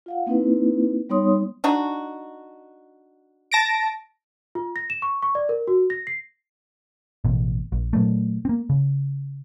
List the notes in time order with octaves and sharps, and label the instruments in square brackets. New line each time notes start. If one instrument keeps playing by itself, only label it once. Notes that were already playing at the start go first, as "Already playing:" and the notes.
[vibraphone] F4 F5 F#5
A#3 C4 D#4 E4 B4
G3 B3 D#4 C#5 C6 D#6
[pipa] D4 D#4 F#4
[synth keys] A5 A#6 D7
[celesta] F4
A#6
E7
C#6
C#6
D5
A#4
F#4
A#6
C7
[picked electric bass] A1 B2
A#1
A#2 F#3 A3
A#3 C4
C#3